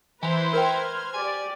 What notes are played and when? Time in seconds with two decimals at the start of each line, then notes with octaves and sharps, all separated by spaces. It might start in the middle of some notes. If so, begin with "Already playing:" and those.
0.23 E3 E4 B4 C5 G#5 A#5 B5
0.53 A#4 G5 F6 G#6
1.14 G4 D5 G#5